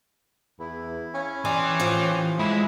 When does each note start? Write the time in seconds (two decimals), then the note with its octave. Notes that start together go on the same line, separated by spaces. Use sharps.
0.60 E2 E4
1.14 C#4
1.45 E3 G4 D5 G#5 C6 D#6
1.80 A2 F3
2.39 G#3 E4